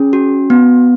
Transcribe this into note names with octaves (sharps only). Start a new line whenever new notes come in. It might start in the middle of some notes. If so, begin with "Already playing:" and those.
Already playing: C#4 G#4
F#4
B3